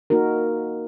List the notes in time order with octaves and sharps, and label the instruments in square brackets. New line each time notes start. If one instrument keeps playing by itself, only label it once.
[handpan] A#3 D#4 F#4 A#4